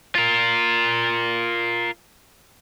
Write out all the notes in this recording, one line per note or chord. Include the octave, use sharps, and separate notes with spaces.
F4 A#4